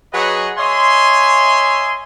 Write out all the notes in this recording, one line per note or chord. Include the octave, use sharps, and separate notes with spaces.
F#3 G#4 B4 C#5 D#5 F#5
C#5 D#5 E5 G#5 C6